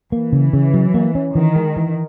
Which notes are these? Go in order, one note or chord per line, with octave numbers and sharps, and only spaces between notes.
E3 A#3
C#3
C#3
F#3
A#3
C#4
D#3 E3
G#3
E3